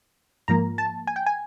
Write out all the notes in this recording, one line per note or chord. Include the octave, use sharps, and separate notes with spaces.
G#2 F3 A#3 A#5
A5
G#5
G5
G#5